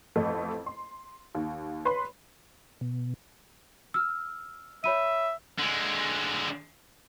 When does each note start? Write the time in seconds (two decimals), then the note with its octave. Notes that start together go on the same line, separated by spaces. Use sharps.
0.16 A1 F2 A3
0.66 C6
1.35 D#2
1.85 B4 C#5 B5 C6
2.81 B2
3.94 E6 F6
4.84 C#5 E5 B5 D#7
5.59 D3 G#3